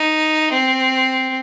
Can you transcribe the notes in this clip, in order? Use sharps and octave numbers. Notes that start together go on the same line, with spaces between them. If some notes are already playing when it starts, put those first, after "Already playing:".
Already playing: D#4
C4